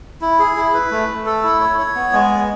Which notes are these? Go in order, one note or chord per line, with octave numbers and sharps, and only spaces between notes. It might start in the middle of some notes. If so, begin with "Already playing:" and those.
E4
G#4
E4
B4
A3
A3
A4
E4
C#5
C#5
B3
G#3
B3